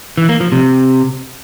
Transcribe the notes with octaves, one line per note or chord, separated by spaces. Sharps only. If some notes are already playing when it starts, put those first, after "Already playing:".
E3
A#3
F3
C3